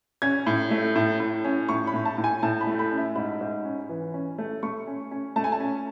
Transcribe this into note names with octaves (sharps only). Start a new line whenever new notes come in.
C#4 G#6
A2
A3
A2
A2
C#4
A2 C#6
B5
A2
A5
A2
G#5
A2 A5
B5
A3
B5
C#4
E5
G#2 B5
G#2
C#4
E3
C#4
A3
A3 C#6
C#4
C#4
A3 A5
G#5
A5
C#4